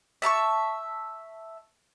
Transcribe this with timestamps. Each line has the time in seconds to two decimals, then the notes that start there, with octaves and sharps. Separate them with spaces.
0.22 E5 A5 A#5 C#6